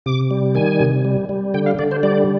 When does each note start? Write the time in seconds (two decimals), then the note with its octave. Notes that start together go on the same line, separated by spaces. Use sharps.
0.06 C3 D6
0.31 G3
0.55 D#3 G#5
0.80 C3
1.05 G3
1.29 G3
1.54 D3 G5
1.66 F5
1.79 D3 D5
1.91 C5
2.03 G3 D5